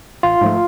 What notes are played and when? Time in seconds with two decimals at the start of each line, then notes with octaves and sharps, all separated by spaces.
0.23 A1 F4
0.41 G#2 F3 A3